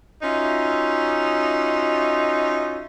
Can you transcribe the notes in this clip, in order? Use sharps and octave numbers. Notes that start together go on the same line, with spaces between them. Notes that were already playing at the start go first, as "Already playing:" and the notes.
C#4 D#4 F4 F#4 E5